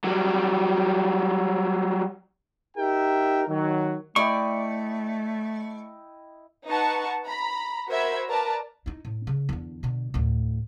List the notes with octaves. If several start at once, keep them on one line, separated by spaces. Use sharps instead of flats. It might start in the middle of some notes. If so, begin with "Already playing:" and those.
F#3 G3
D#4 G4 A#4 E5 G5
D#3 F#3
A3 E4 D5 D#5 G5 C#6
D#4 B4 F#5 A5 C#6
A#5 B5
F#4 A#4 C5 E5 B5 G#6
A#4 B4 D5 A5 A#5
D#4 E4
A2
C#3
E2 D3
B2 D3
D2 A2